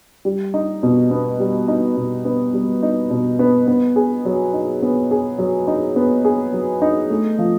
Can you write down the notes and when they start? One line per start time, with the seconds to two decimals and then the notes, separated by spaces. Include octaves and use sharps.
0.25 G3
0.54 D#4
0.83 B2
1.11 B3
1.40 G3
1.68 D#4
1.97 B2
2.25 B3
2.53 G3
2.83 D#4
3.10 B2
3.39 B3
3.68 B3
3.96 G#4
4.25 F#3
4.53 D#4
4.82 B3
5.11 G#4
5.39 F#3
5.68 D#4
5.96 B3
6.25 G#4
6.53 F#3
6.82 D#4
7.10 A3
7.39 F3